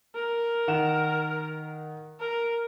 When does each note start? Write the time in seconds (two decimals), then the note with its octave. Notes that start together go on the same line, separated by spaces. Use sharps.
0.15 A#4
0.68 D#3 F#5 E7
2.20 A#4